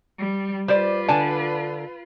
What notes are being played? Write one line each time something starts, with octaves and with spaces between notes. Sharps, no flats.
G3
G3 F4 B4 C5 D5
D3 D5 G#5 A5